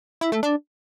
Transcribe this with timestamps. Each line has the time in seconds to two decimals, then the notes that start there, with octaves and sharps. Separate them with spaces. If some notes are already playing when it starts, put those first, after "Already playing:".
0.21 E4
0.32 A3
0.43 D4